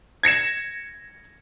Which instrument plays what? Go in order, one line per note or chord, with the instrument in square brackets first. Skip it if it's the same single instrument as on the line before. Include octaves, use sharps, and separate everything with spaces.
[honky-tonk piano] G#6 A#6 C#7 E7